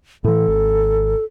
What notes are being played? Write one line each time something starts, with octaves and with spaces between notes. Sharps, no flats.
A2 E3 A4
G#1